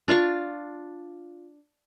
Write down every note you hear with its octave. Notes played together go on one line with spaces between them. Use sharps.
D4 F4 F5 C#6